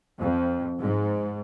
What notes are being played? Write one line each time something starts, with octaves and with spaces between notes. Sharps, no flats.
F2
G#2